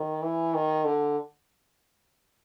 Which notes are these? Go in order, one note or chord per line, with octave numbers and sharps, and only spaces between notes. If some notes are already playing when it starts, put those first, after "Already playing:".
Already playing: D#3
E3
D#3
D3